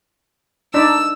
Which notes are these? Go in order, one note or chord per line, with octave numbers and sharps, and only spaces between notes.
D4 D#4 D5 E6